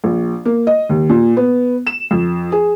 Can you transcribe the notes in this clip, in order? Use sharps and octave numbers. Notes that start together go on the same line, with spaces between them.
A#1
A#3
D#5
D#2
A#2
B3
E7
F2
G#4